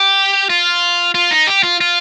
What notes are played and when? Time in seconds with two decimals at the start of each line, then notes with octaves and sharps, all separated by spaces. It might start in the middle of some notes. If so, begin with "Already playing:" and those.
Already playing: G4
0.50 F4
1.15 F4
1.31 D#4
1.47 G4
1.63 F4
1.81 F4